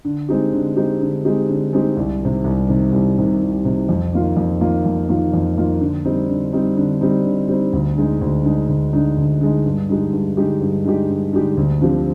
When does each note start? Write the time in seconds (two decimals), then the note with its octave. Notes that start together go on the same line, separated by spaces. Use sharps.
0.05 D3
0.29 G#3 C4 D#4 G4
0.53 D3
0.77 G#3 C4 D#4 G4
1.01 D3
1.25 G#3 C4 D#4 G4
1.49 D3
1.73 G#3 C4 D#4 G4
1.97 C2
2.21 C3 D#3
2.44 C2
2.68 C3 D#3
2.93 C2
3.18 C3 D#3
3.41 C2
3.65 C3 D#3
3.89 F2
4.13 D#3 A#3 F4
4.37 F2
4.61 D#3 A#3 F4
4.85 F2
5.09 D#3 A#3 F4
5.33 F2
5.57 D#3 A#3 F4
5.81 D3
6.05 G3 C4 D#4
6.29 D3
6.53 G3 C4 D#4
6.77 D3
7.01 G3 C4 D#4
7.25 D3
7.49 G3 C4 D#4
7.73 D2
7.97 D3 G#3 D#4
8.21 D2
8.45 D3 G#3 D#4
8.69 D2
8.93 D3 G#3 D#4
9.18 D2
9.41 D3 G#3 D#4
9.66 G2
9.89 D3 G#3 D#4 G4
10.13 G2
10.37 D3 G#3 D#4 G4
10.61 G2
10.85 D3 G#3 D#4 G4
11.09 G2
11.33 D3 G#3 D#4 G4
11.57 D2
11.81 D3 F3 C4 G4